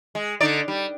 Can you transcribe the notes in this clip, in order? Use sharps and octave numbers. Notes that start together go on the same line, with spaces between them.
G#3
D3 D#4 D5
G3